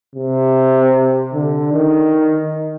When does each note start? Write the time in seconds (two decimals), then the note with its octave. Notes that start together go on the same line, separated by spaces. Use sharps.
0.16 C3
1.34 D3
1.73 D#3